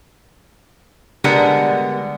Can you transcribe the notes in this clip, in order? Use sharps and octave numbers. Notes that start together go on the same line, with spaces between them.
D3 G3 G#3 B3 A#4 F#5